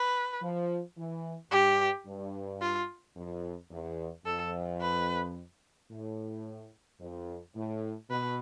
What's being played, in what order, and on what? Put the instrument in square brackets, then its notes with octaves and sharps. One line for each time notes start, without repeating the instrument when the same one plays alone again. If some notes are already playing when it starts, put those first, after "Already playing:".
Already playing: [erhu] B4
[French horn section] F3
E3
[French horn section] G2 [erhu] G4
[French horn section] G2
[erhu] F4
[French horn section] F2
E2
[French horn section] F2 [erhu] A4
[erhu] B4
[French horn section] A2
F2
A2
[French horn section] B2 [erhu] B4